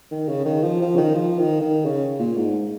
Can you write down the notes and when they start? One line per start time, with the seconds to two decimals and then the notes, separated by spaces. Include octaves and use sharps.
0.11 D#3
0.28 C#3
0.45 D#3
0.63 F3
0.81 F3
0.94 C#3
0.97 D#3
1.15 F3
1.39 D#3
1.61 D#3
1.85 C#3
2.19 A#2
2.38 G#2